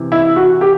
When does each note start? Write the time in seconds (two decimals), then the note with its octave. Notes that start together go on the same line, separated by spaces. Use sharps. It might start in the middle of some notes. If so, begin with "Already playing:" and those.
Already playing: C3 E3
0.12 E4
0.36 F#4
0.61 G4